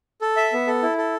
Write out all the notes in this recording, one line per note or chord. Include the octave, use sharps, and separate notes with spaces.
A4
E5
B3
A4
E4
A4